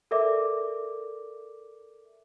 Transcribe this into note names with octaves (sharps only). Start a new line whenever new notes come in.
A4 A#4 D5 E5 D6